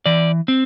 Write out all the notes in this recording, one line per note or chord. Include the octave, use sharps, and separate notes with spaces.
E3 D5
C4